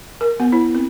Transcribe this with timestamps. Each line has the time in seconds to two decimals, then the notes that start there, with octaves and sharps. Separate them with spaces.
0.21 A#4
0.40 B3
0.52 E4
0.75 C4